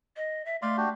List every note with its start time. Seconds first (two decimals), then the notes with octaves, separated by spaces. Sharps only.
0.16 D#5
0.45 E5
0.62 A3 D5 F5 C6
0.77 D4 F#4 G4